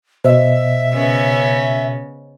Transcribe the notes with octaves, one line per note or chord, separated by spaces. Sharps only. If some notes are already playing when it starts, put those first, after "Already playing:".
B2 C5 D#5 E5
C#3 B3 C#4